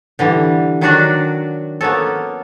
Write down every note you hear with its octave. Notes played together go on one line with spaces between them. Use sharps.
D3 E3 G3
D#3 F#3 D4 F#4 C#5 D5
A#3 B3 C#4 A4